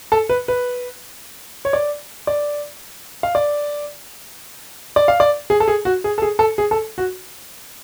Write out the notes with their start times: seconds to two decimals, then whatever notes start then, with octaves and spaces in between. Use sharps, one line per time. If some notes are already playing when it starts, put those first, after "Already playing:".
0.12 A4
0.29 B4
0.48 B4
1.65 C#5
1.73 D5
2.27 D5
3.23 F5
3.35 D5
4.96 D5
5.08 F5
5.20 D5
5.50 G#4
5.60 A4
5.68 G#4
5.85 F#4
6.04 G#4
6.18 A4
6.22 G#4
6.39 A4
6.58 G#4
6.71 A4
6.98 F#4